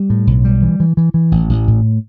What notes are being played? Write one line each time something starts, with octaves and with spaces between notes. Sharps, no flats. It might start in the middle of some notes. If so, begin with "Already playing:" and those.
Already playing: G3
A2
B1
G3
E3
E3
E3
E3
A1
A1
A2